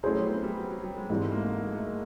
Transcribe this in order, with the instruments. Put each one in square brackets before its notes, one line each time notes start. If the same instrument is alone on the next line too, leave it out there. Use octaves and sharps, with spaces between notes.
[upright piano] F#3 [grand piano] A3 C#4 E4 G#4 C5
[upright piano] G3
B3
C4
G3
F#3
F#3
G3
G#3
[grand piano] G#2 E3 G3 C4 [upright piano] G#3
[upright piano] A3
A#3
A3
A3
G#3
A3
G#3